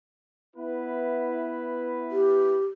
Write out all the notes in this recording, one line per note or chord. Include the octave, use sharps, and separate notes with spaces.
B3 E4 B4
G4